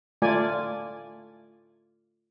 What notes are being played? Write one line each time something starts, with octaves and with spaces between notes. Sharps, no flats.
A3 F4 D5 G#5